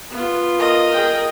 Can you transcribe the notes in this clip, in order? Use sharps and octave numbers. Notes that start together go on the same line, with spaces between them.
B3 F4
A#4 D#5
G#4 G5